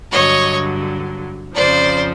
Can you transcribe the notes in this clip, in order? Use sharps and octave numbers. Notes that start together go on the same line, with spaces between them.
G2 D3 F#3 C#5 D#5
F2 C#3 F3 C5 D5